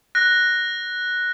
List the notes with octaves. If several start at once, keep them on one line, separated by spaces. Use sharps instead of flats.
F#6 A#6